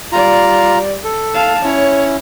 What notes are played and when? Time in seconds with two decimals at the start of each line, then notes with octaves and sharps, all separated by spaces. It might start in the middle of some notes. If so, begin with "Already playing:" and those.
0.12 G3 F4 D5 A#5
1.04 A4
1.34 F5 A5
1.64 C#4 E4 C#5